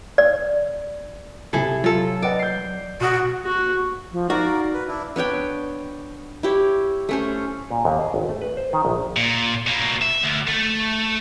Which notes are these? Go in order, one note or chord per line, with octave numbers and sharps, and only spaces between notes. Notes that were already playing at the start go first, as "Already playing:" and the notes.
D5
C3 E4 G#4 A4
F#3 F4 A4
B4 D5 D#5 F#5
G6 C7
B2 F#4 C#6 D#6 D7
F#4
F3
D#4 F#4 A#4 D5 F5
B4
D4 E4
B3 D4 C#5 G5
E4 G4 C#5
A3 C#4 C5
A#2
D#2
G#4
G#1
A3
B4
C5
D#3
A#1
A#2
B2 A#3
E5
D2
A3